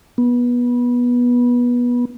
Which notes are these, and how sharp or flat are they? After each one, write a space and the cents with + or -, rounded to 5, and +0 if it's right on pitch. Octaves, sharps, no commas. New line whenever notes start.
B3 -20